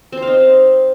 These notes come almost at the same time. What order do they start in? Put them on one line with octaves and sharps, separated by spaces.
C4 C5 F5 D#4